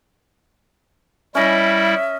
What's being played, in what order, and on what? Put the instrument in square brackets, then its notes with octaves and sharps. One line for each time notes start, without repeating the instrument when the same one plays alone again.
[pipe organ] G3 E4 [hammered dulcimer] C#4 D#5 [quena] E5